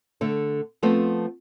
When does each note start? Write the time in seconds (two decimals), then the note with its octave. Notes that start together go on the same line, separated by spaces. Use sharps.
0.21 D3 A3 A4
0.82 F3 A3 B3 C4